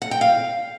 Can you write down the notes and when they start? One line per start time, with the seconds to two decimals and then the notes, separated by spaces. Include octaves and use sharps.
0.02 F#5
0.11 G5
0.21 F5